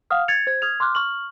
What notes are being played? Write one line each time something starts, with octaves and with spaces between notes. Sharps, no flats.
F5 F#5 D#6 F6
G#6 A6 C#7 F7
C5 G#6
D#6 F6 G#6 F7
C6 D6 F6 F#6
C#6 F6 F#7